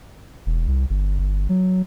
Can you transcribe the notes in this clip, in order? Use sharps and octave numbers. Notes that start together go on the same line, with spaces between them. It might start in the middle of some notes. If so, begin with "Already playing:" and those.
E1
C2
G1
G1
F#3